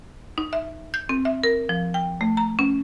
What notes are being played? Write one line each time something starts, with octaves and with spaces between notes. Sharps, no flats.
D#4
E5
G6
C4
E5
A#4
F3
G5
A3
A#5
C#4